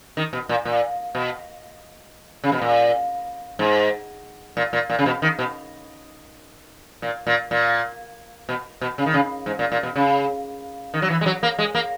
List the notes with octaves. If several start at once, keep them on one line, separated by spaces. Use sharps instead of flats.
D#3
B2
A#2
A#2
B2
C#3
B2
A#2
G#2
A#2
A#2
A#2
C#3
B2
D#3
B2
A#2
A#2
A#2
B2
B2
C#3
D#3
C#3
G#2
A#2
A#2
B2
C#3
D#3
F#3
E3
G#3
F#3
A#3
G#3
A#3